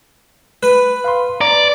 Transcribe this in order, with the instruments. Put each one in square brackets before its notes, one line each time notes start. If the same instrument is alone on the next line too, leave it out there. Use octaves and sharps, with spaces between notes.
[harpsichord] B4 [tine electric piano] F#6
[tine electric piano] F5 B5 C6
[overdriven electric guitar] D5 [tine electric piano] A#5